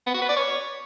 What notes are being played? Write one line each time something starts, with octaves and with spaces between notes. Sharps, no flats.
B3
F#4
B4
D5
C#5